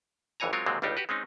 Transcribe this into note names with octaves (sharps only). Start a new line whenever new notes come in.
G#1 F2 E3 C#5 G#5 A#5
F#3 G#3 C4 F4 A#4 C#5
D#2 A#2 D3 F#3 G#3 C4
G1 C#2 G3 D4 D#4 G4
F#4 G4 B4
G#3 C4 C#4 D#4